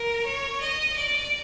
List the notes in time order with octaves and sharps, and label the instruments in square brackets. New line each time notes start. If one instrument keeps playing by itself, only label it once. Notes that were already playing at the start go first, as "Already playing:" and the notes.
Already playing: [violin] A#4
C#5
D#5
D5